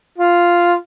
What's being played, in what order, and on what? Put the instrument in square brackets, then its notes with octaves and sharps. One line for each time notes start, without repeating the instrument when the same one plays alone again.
[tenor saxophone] F4